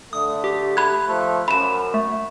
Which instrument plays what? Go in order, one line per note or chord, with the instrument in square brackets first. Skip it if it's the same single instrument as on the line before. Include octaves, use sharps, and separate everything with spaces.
[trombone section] D3 A3 [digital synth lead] D#6
[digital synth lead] G4
[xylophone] B5 G#6 [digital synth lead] F#6
[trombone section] F3 A3
[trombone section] F#2 [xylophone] B5 E7
[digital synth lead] A3